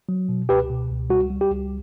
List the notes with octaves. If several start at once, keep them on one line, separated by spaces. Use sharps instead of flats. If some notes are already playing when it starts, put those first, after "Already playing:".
F#3
B2
C#2 G4 B4
B2
C#2
G3 F#4
G3
G4
C#2